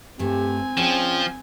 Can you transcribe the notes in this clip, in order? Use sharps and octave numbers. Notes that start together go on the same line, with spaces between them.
G2 A3 C4 G4 G#5
F3 C#4 G#4 D5 G5